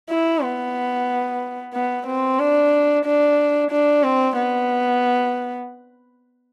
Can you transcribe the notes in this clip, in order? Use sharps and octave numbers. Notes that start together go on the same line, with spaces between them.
E4
B3
B3
C4
D4
D4
D4
C4
B3